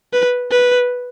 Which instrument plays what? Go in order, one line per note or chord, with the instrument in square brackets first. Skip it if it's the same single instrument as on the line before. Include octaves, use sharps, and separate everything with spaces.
[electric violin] B4
B4